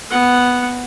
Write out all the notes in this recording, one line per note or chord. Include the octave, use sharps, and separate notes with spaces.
B3 F#5